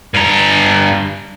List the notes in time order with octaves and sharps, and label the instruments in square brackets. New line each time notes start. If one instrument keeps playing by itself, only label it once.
[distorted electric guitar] G2 A#5